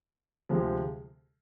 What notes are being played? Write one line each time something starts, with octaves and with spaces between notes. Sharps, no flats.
D2 C3 F3 G#3